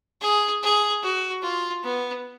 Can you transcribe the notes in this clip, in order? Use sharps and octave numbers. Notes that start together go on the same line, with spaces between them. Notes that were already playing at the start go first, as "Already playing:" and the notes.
G#4
G#4
F#4
F4
B3